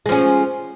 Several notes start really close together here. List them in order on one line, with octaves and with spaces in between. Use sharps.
G#3 F3 C#4